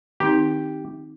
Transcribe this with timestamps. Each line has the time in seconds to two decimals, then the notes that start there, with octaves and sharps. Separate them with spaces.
0.20 D#3 C4 D#4 G4